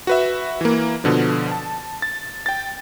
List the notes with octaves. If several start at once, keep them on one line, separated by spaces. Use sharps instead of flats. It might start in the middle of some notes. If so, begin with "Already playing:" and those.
F#4 B4 E5
E3 A#3
B2 D3 F3
A5
A6
G5 A6